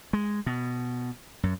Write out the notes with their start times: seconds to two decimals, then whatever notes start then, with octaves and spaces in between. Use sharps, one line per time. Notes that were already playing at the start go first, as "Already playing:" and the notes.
0.13 G#3
0.46 B2
1.43 F#2